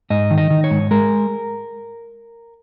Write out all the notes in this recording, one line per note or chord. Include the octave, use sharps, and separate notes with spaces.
G#2 D#5
D#3
D#5
D#3
C#5
G#2
G#3 A#4